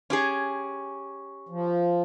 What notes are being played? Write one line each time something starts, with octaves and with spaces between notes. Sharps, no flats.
C#4 G4 G#4
F3